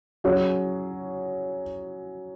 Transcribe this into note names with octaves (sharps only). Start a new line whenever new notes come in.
F#3 C#4 G#4